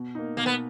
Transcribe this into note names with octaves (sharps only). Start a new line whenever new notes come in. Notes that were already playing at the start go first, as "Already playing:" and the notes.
Already playing: B2
A#3 D#4
B2 A#3
B3